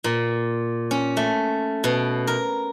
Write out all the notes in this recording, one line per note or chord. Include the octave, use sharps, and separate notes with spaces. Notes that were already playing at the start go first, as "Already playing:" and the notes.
A#2
C#4
A3
B2
A#4